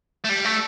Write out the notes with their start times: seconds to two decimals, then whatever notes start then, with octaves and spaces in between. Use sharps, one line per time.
0.25 A3
0.30 G3
0.45 A3